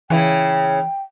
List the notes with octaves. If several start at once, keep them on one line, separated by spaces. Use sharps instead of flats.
C#3 E3 E4 G5